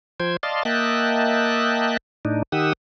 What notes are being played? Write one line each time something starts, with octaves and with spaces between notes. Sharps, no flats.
F3 C5 G5 G#6
D5 D#5 F5 A5 C6
A#3 D#5 E5 G5 A5 F#6
A2 D4 D#4
D#3 G4 F#5 D#6 E6